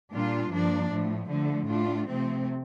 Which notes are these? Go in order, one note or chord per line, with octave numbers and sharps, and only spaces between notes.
A#2 G3 D4 F4
G2 F3 A#3 D4
A2 F3 A3
D3 F3 A3
A2 A3 D4 F4
C3 F3 A3 C4